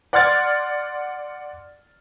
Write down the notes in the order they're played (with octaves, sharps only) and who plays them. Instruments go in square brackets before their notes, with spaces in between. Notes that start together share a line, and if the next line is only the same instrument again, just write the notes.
[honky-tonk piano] D5 F#5 C6 F6 G#6 A6